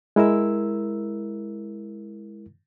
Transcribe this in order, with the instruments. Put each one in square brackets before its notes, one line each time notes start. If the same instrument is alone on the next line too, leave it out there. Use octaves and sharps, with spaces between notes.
[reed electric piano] G#3 E4 A#4 E6